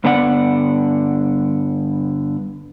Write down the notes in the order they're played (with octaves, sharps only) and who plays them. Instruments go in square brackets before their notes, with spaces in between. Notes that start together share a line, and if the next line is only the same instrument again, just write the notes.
[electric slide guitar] G2 D3 B3 D5 F#5